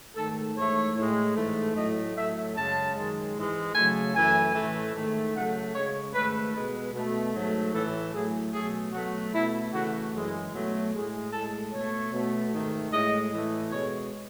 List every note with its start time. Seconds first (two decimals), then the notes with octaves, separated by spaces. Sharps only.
0.15 G#2 D#3 A3 A4
0.56 G#2 E3 A3 C#5
0.96 A2 G#3
1.35 G#2 E3 A3
1.75 A2 F#3 A3 D#5
2.15 A2 F#3 A3 E5
2.55 F#2 C#3 G#3 A5
2.95 F#2 D#3 G#3
3.35 G#2 E3 G#3
3.74 C#3 F#3 A3 G#5
4.14 F#2 E3 A3 G#5
4.54 A2 E3 A3
4.94 G#2 D#3 A3
5.34 C#3 F#3 A3 F#5
5.73 C#3 G#3 C#5
6.13 G#2 D#3 A3 B4
6.53 B2 G#3 B4
6.93 B2 A3
7.34 G#2 F#3 A3
7.73 A2 E3 A3 A4
8.13 A2 F#3 A3 G#4
8.53 B2 F#3 A3 G#4
8.92 B2 F#3 A3 F#4
9.32 B2 A3 E4
9.72 C#3 E3 A3 F#4
10.12 F#2 E3 G#3
10.51 B2 F#3 A3
10.92 A2 G#3 G#4
11.32 A2 G#3 A4
11.72 B2 A3 C#5
12.11 B2 A3
12.52 G#2 D#3 A3
12.91 A2 G#3 D#5
13.30 A2 E3 A3
13.71 B2 G#3 C#5